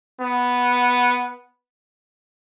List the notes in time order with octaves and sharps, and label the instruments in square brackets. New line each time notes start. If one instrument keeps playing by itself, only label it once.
[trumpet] B3